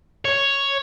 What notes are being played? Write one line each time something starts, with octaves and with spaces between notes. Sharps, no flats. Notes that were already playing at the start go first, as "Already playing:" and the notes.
C#5